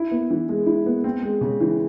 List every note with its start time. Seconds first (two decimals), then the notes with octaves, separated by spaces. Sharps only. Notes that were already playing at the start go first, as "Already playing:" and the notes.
Already playing: E4
0.11 B3
0.30 E3
0.49 G#3
0.66 E4
0.86 B3
1.04 C4
1.22 G#3
1.41 C#3
1.61 E3